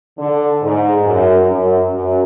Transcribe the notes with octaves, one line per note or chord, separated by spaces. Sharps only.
D3
G#2
F#2
F#2
F#2